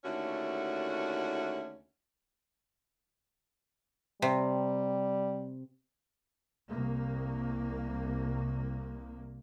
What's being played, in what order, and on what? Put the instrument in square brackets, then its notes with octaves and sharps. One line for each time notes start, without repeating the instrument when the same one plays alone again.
[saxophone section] D#2 D3 A3 C#4 E4 F#4
[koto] C3 [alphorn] G3
[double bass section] C2 A#3